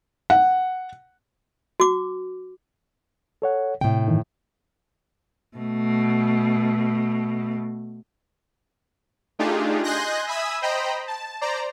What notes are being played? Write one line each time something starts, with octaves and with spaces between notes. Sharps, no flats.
F#5
F#4 D6
A4 C#5 F#5
A2 C3 G5
G2 D#3 E3
B2 A3
A3 D4 D#4 F4 G4 G#4
D#5 G#5 C6 F#6 G6 A#6
E5 G#5 B5 D#6 E6
C5 D#5 G5 A#5 B5
A5
C5 D5 A#5